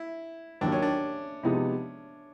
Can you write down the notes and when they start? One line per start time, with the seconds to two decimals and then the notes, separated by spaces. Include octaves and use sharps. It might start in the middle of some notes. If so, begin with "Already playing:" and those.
Already playing: E4
0.61 D#2 D#3 F#3 A#3 D4
0.72 C#4
0.82 D4
1.43 C3 F3 G#3 B3 D#4